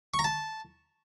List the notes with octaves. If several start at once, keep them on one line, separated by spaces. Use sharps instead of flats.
C#6
A#5
A5